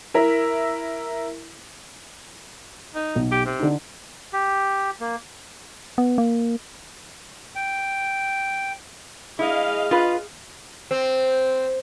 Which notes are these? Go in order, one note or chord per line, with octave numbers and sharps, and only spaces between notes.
E4 A#4 E5
D#4
B1
G4
C3
D3 D#4
G4
A#3
B3
A#3
G5
E4 G#4 D#5 F5
F4 B4
C4